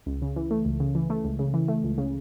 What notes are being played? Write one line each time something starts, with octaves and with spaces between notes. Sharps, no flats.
C#2
C#3
E3
A3
C#2
C#3
E3
A3
C#2
C#3
E3
A3
C#2
C#3